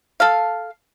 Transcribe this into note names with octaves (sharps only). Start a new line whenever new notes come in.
A4 F5